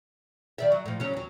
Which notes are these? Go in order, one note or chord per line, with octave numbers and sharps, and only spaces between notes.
D#3 D5 E5
F#3
A2 F3
C#3 F#3 C#4
D#2 F#3